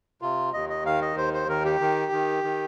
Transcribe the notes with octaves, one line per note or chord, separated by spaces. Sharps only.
C3 F4
D#2 D#5
D#5
D#3 F5
D#5
D#2 C5
C5
D#3 A#4
G4
D#3
D#3
D#3